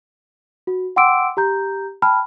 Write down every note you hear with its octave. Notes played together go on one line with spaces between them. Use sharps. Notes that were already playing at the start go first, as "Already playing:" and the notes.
F#4
F#5 G5 C6 D6 E6 D7
G4 A#5 G6
G5 A5 B5 F6